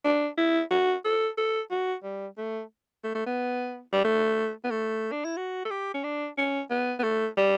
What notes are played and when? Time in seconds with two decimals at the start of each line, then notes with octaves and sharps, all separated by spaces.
0.05 D4
0.38 E4
0.71 F#4
1.05 A4
1.37 A4
1.71 F#4
2.04 G3
2.38 A3
3.04 A3
3.15 A3
3.26 B3
3.93 G3
4.04 A3
4.64 B3
4.71 A3
5.12 D4
5.25 E4
5.37 F#4
5.65 A4
5.71 G4
5.94 C#4
6.04 D4
6.38 C#4
6.71 B3
6.99 B3
7.04 A3
7.37 G3